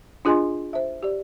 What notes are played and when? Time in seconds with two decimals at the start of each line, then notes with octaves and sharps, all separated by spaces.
0.25 D4 F4 G#4 D#5 G#5 C6
0.73 C5 E5
1.03 G4 D5